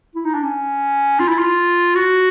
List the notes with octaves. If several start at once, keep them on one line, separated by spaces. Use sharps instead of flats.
E4
D#4
D4
C#4
F4
E4
F4
F#4